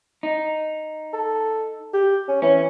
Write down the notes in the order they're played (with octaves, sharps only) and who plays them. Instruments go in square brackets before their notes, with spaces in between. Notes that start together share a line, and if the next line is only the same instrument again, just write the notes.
[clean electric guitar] D#4
[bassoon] A4
G4
C#4
[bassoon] E3 [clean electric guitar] C#4